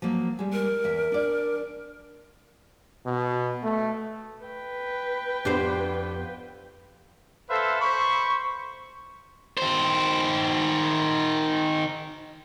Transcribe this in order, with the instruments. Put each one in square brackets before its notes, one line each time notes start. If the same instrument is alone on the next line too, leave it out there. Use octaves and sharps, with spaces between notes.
[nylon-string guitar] F3 F#3 A#3
G3 G#3
[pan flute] A#4
[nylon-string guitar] E2 E5
D4 D5
[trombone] B2
A3
[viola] B4 G5
[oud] F2 G4 C5 [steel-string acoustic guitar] B3 D4
[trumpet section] A4 B4 C5 E5 F5
C5 B5 C#6
[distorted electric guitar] D#3 C5